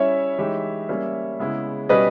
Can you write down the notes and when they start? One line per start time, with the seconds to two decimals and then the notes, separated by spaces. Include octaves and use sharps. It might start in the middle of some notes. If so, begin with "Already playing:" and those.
Already playing: G3 C#4 E4 C#5 E5
0.38 E3 G#3 D#4 G4
0.89 G3 A#3 C#4
1.40 C#3 G#3 B3 E4
1.89 B2 G3 C#4 G4 B4 D#5